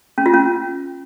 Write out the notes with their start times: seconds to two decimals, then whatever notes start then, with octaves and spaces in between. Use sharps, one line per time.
0.18 C#4
0.26 F4
0.34 C#4